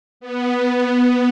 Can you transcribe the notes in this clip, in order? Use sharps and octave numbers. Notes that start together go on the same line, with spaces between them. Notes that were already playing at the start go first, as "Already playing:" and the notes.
B3